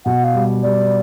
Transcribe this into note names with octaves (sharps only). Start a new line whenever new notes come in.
B2 F#5
F5
G3
G3 D5